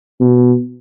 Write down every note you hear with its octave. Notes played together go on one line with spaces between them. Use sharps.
B2